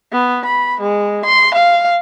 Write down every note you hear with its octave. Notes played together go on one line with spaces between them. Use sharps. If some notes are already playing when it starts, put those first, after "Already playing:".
B3
B5
G#3
C6
F5